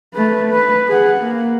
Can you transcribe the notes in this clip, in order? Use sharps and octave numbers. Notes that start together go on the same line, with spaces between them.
A3 B4
B4
G#4 F#5
A#3